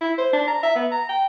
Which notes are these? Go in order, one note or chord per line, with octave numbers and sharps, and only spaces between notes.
E4
C5
D4
A#5
E5
B3
A#5
G5